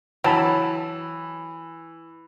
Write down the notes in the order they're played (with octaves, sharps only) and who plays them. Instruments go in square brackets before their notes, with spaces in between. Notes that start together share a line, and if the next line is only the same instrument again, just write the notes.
[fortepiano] E3 [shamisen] F#3 [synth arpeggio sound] G5 A5 B5